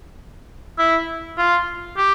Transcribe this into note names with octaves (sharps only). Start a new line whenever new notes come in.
E4
F4
G4